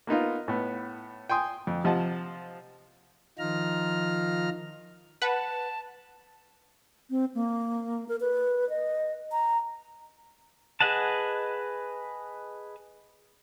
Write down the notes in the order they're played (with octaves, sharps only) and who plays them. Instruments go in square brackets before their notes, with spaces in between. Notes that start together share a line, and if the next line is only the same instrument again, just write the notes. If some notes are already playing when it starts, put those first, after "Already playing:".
[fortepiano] A#3 B3 D#4 F4
A2 B3
G5 G#5 C6 D#6
F2
C3 F3 D#5 F#5 A5
[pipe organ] D#3 F3 D#4 F4 A#5 F6
[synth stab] B4 F#5 [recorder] A5
[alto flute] C4
A#3
A#4
B4
D#5
A#5
[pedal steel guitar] G#4 B4 D#5 F#5 A5